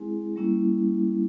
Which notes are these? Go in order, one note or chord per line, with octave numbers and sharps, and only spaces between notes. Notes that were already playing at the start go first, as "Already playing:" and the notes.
Already playing: G#3 C4 E4 G#4
G3 A#3 C#4 E4